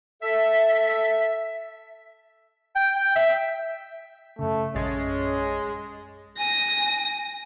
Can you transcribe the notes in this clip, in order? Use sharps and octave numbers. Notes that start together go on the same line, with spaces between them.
A4 E5
G5
G5
E5
F#2 C#3 A3
A#1 F#2 G#3 C#4 A6
G#5 A#6